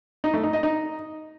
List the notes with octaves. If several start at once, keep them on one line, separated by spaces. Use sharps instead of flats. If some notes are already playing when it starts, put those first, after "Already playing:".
D#4
A3
D#4
D#5
D#4